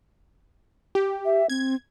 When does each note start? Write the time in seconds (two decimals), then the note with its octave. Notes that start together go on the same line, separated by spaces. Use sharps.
0.95 G4
1.25 E5
1.50 C4 G#6